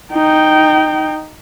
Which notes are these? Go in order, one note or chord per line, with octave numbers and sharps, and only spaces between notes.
D#4 G5